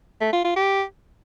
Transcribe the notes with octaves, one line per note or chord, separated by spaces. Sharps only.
A3
F4
F4
G4